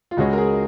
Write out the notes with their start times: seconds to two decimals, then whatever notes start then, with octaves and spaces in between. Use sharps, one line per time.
0.11 F4
0.17 C#2 C#3 G#3 C#4 F#4
0.33 A#4
0.38 G#4